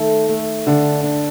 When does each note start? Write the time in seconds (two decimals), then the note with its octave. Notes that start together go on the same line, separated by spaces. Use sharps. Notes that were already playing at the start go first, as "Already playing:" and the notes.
Already playing: D#3 A3 A4
0.29 A3
0.67 D3 D4
1.03 D4